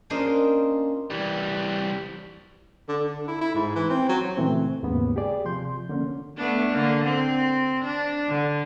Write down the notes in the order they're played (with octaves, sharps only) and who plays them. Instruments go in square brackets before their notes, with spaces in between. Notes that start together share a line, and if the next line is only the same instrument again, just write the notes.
[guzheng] A#3 C#4 D4 F4 C5 D#5
[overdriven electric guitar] E3 G3
[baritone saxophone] D3
D3
E4
E4
G#2
E3
C4
F#3
[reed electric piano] A#2 C#3 E3 A3 C4
D#2 G#2 C#3 A#3 B3
G4 G#4 D5
C3 F3 C6 G6
D3 A#3 C#4
[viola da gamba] A3 B3 D4
D3 A#3
C4
D4
D3